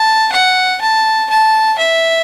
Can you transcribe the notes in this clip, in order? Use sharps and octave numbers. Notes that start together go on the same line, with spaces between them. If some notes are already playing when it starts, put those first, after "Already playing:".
Already playing: A5
F#5
A5
A5
E5